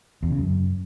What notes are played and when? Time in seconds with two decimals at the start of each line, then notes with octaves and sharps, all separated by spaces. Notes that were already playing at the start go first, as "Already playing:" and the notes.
0.23 E2
0.30 C#3
0.38 F#2